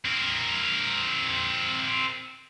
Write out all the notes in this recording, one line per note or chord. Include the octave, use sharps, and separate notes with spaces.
C4 A#4